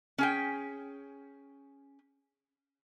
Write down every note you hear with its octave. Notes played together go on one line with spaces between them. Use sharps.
C#4 G#4 G5